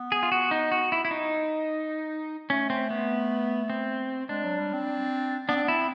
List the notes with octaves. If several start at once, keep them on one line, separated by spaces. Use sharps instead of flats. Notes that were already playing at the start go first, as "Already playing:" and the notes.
Already playing: B3
G#4
F4
F#4
D#4
F#4
E4
E4
D#4
A3 C#4
C4
B3
C4
G#3 D4
F#3
G3
C4
B3 D4
C4
B3 E4
C4